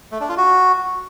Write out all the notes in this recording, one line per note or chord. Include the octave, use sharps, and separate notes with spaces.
A3
D4
F4
F#4